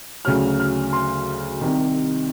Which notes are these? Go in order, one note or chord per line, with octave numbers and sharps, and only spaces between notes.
D2 C#3 F#3 F6
F6
C6
C2 C3 D#3